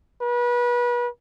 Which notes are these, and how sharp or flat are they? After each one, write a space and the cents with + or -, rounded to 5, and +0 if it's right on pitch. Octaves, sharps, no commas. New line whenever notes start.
B4 -30